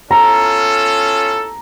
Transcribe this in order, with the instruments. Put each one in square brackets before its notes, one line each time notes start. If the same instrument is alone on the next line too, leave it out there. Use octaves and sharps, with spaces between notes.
[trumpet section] C#4 F4 A4 [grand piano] A#5